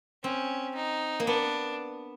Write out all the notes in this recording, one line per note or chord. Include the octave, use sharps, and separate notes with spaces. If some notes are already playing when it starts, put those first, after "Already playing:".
C4 C#4
D#4
A#3
B3 D4